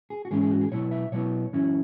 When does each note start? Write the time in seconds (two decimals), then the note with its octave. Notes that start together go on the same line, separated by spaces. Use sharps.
0.10 G#4
0.25 F#4
0.31 G#2 E3 G#3 C#4 G#4
0.41 G#4
0.51 F#4
0.61 G#4
0.72 B2 F#3 B3 E4 C#5
0.91 E5
1.12 B2 F#3 B3 E4 C#5
1.53 F#2 E3 C#4 E4